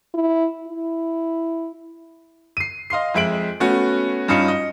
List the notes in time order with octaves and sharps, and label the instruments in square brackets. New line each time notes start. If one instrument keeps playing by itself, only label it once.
[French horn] E4
E4
[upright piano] C7 D#7
D#5 F5 C6 C7
F2 G#3 E5 D7 F#7
A3 B3 C#4 F#4
G2 C#4 D#4 F4 D#6 C#7
D#5